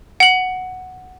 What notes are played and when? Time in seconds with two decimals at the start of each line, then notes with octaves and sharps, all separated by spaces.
0.20 F#5 F#7